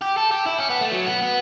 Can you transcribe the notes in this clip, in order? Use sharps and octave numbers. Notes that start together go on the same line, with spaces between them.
G4
A4
G4
E4
C#4
B3
A3
F#3
B3
B3